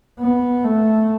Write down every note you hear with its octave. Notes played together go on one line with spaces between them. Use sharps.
B3
A3